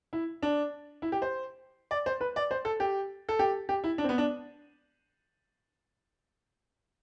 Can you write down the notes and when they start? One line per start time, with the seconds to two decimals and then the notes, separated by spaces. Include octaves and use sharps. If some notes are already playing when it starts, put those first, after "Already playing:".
0.13 E4
0.43 D4
1.02 E4
1.12 G4
1.22 C5
1.91 D5
2.06 C5
2.21 B4
2.36 D5
2.51 C5
2.65 A4
2.80 G4
3.29 A4
3.39 G4
3.69 G4
3.84 E4
3.98 D4
4.04 C4
4.09 B3
4.18 D4